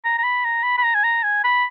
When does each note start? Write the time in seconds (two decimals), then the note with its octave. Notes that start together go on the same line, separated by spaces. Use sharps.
0.04 A#5
0.18 A#5
0.24 B5
0.45 A#5
0.63 B5
0.78 B5
0.83 A#5
0.95 G#5
1.04 A#5
1.23 G#5
1.44 B5